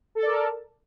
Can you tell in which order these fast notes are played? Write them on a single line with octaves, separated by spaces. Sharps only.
A4 A5 D5 A#4